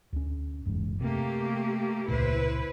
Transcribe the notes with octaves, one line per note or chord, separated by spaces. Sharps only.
D2 C#4
F#1 E2 G#2
C3 A3 A#3 G4
E1 C#2 A#2 E4 B4 C5